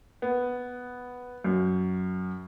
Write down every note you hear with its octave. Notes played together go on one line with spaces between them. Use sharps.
B3
F#2